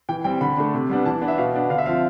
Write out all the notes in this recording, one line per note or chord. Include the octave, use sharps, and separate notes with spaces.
E3 G5
G3 C4 G5
D3 B5
A3 D4
C3
G3 B3 D4
E3 A5
B3 D4
E5
B2 F5
B3 D4
D3 F5
E5
F3 C4 F5